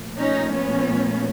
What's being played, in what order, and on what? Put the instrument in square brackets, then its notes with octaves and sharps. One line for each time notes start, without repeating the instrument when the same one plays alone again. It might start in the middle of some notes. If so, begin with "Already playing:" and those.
Already playing: [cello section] A#2 F3 A3
C#4 D#4
B3 C#4